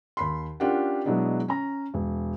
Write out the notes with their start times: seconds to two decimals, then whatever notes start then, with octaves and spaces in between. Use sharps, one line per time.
0.17 D#2 B5 C6
0.60 C#4 D4 F4 G4 A#4 F#5
1.05 B2 F#3 G#3 B3 D4 E4
1.48 C#4 A#5
1.94 E1